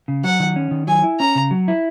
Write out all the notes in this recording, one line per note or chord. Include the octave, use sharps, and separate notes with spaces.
C#3
F#3 F#5
D#3
C#4
D#3
F#3 G#5
E4
C#4 A#5
C#3
F#3
E4